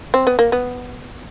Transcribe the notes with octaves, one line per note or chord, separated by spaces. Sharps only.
C4
B3
A#3
B3